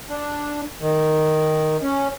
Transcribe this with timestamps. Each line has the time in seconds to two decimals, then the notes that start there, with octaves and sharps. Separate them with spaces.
0.10 D4
0.81 D#3
1.82 C#4